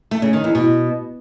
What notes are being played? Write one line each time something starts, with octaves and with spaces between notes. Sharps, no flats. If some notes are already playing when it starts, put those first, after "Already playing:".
A3
C#3
D#3
E2
B2